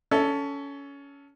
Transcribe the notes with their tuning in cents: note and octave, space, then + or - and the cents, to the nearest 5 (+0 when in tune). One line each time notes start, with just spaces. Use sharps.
C#4 +20 A4 +0 E5 +0